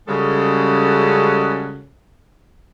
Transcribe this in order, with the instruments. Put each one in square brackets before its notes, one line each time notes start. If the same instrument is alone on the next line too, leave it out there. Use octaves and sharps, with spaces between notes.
[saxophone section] C#3 G3 G#3 C#4 F#4 A4